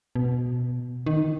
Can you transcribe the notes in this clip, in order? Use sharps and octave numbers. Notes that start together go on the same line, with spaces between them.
B2
D#3